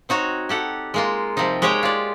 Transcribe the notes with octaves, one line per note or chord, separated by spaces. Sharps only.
C4 D#4 F#4 C#5
G4 A4 F#5
G#3 A#3 F4
C3 F3 G3 C4 D#4
G#3 G4 G#4 C#5 F#5 G5
F4 D5